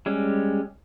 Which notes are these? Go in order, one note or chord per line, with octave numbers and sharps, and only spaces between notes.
G3 G#3 C#4